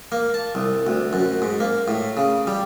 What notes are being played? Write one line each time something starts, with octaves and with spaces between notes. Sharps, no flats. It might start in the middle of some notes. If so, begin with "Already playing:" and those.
A#3
A5
C2
D2
F#2
G#2
A#3
A2
C#3
G3